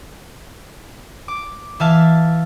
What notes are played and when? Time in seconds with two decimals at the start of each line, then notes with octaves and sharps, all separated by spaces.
1.28 D6
1.80 E3 E5 F5 A5